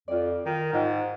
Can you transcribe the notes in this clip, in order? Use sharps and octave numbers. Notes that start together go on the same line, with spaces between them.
F2 F4 D5
D#3 F4
G#2 F4 G4 D#5